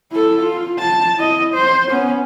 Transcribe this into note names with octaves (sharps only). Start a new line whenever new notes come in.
E4 A4
F4
A5
E4 D#5
C5
B3 C#4